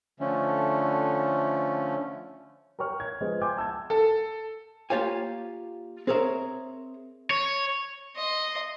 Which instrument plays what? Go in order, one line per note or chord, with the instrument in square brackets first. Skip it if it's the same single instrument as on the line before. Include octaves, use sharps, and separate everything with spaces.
[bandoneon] D3 F3 A3 C#4
[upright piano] A#4 C#5 G5 C#6 F6
G#6
F3 G#3 B4 C5 D#5
G5 G#5 C6 D6 G6 G#6
A5 E6 G6 G#6
[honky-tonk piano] A4
[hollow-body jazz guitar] A#3 F4 G4 C#5 F5 G#5
C4 G#4 A#4 C#5 E5
[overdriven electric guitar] C#5
[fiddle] D#5 C6